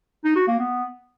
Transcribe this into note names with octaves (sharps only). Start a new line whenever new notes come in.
D#4
F#4
A#3
B3